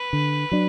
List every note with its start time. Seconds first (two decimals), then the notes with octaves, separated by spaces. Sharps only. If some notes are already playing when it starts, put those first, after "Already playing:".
Already playing: B4
0.13 D3
0.52 F#3 D4